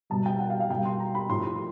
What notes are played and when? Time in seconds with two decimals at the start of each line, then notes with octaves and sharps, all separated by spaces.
0.10 B2 G3 A5
0.26 G5
0.40 F#5
0.50 F5
0.60 F5
0.70 B2 G3 G5
0.85 C6
0.99 A#5
1.15 B5
1.29 A2 F3 C6
1.44 C6